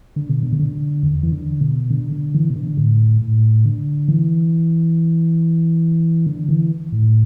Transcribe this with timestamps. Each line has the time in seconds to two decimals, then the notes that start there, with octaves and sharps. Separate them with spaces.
0.16 D3
0.29 B2
0.43 D3
0.52 B2
0.59 D3
1.03 E2
1.23 E3
1.32 D3
1.61 B2
1.90 D3
2.12 D3
2.34 E3
2.50 B2
2.56 D3
2.77 A2
3.21 A2
3.65 D3
4.08 E3
6.27 D3
6.49 E3
6.92 A2